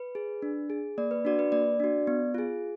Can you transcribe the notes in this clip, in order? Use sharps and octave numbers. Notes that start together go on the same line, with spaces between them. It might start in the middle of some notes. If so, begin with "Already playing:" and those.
Already playing: B4
G#4
D4
G#4
A#3 D5
B4
D4 F#4 D5
B4
A#3 D5
D4 F#4
B3
F4 G#4